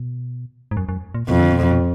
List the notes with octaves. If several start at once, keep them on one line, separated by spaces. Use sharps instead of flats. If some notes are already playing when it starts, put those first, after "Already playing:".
Already playing: B2
G#2
F#2
F#2
A#2
F2 B2
D3
B2
B2